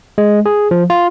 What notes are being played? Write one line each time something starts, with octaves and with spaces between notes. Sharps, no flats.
G#3
G#4
F3
F4